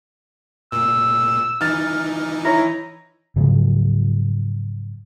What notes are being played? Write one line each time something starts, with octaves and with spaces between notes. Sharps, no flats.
A#2 E6
E3 D#4 F6 A6
E4 C#5 A#5
G#2 C#3 F3 F#3